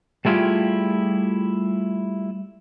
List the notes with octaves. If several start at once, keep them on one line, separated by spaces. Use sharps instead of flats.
G3 A3 E4 F4 G4 G#4